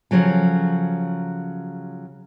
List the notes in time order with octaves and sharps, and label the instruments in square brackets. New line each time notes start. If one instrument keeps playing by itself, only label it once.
[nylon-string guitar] C#3 F3 F#3 A4